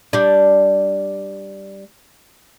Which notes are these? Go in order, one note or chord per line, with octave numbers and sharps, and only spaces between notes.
G3 D4